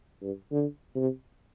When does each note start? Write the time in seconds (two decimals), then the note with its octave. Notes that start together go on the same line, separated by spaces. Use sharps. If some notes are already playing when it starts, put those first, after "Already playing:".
0.23 G2
0.51 D3
0.95 C3